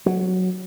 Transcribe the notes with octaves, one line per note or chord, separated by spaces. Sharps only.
F#3